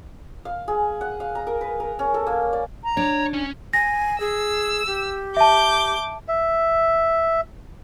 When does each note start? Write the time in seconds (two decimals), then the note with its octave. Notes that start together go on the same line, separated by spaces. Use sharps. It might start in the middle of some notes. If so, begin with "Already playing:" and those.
0.45 F5
0.68 G#4
1.01 F#5
1.20 F5
1.35 A#5
1.47 A#4
1.61 B4
1.80 A#4
1.99 C#4
2.14 A4
2.27 A#3
2.53 D5
2.84 A#5
2.97 D4 C#5
3.33 C#4 G#5
3.73 G#5 A#6
4.20 G#4 E6
4.87 G4
5.37 E5 A5 D6 G6
6.28 E5